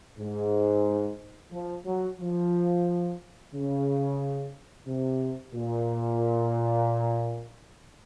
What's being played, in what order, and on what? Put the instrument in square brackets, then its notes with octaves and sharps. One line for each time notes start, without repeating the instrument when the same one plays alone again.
[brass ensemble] G#2
F3
F#3
F3
C#3
C3
A#2